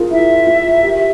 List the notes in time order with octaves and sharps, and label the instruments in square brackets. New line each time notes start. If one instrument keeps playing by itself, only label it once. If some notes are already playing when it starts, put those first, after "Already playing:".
Already playing: [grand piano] F4 G#4 A#4
[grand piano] E4 [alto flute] E5
[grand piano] F4
G4